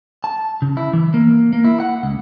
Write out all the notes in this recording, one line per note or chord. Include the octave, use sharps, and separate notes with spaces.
A5
C#3
E4
E3
A#3
A#3
E4
F#5
C#2